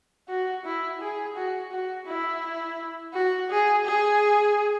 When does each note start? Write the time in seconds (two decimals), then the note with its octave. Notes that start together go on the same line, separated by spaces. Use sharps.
0.29 F#4
0.65 E4
1.01 G#4
1.36 F#4
1.72 F#4
2.07 E4
3.14 F#4
3.50 G#4
3.85 G#4